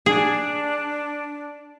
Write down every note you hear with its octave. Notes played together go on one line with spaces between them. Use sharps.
D4 G#4